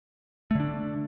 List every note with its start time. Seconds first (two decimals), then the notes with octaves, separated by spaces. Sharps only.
0.51 A3
0.55 D3
0.60 D4